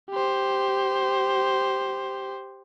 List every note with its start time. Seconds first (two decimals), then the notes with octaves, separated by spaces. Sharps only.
0.11 G4 C5